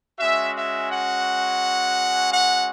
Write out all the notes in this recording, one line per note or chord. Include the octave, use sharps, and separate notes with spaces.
G#3 C#4 F#4 E5
E5
F#5
F#5